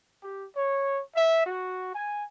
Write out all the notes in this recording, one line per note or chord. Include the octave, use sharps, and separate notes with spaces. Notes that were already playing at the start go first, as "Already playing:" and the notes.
G4
C#5
E5
F#4
G#5